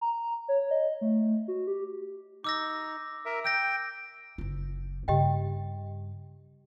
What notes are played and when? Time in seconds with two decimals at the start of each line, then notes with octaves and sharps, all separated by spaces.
0.01 A#5
0.49 C#5
0.71 D#5
1.01 A3
1.48 F#4
1.67 G4
2.44 D#4 D6 E6 A#6
3.25 A#4 E5
3.44 G5 E6 G6 A#6
4.38 F#1 F4
5.08 G2 C#3 G4 D#5 G5